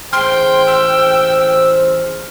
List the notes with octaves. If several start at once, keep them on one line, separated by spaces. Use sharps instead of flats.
A1 G#4 C5 G5 C6 F6
E6